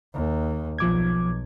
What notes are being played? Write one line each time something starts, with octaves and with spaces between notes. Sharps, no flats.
D#2
B1 F3 D6 G#6